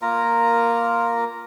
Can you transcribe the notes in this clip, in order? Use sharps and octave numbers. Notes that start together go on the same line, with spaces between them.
A#3 F4 A#4 A#5